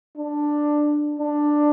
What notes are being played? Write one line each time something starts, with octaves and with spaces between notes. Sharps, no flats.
D4
D4